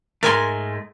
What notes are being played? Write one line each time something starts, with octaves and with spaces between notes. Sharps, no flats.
G#2 G#3 A3 A#4 G#5 C6